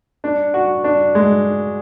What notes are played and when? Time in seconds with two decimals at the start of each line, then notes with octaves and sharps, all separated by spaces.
0.24 D4
0.54 F#4
0.84 D4
1.15 G#3